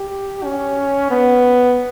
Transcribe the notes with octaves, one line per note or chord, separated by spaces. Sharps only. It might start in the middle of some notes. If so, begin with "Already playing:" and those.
Already playing: G4
C#4
B3